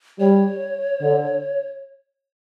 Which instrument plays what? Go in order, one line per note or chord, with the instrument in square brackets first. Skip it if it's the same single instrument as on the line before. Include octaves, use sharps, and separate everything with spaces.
[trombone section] G3 [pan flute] C#5
[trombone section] D3